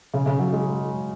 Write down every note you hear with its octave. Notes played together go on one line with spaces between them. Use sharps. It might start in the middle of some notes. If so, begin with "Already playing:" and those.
C#3
C#3
F#3
G#3